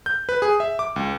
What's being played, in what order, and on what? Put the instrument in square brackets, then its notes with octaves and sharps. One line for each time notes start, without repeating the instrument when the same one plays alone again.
[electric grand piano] G6
B4
G#4
E5
D6
C#2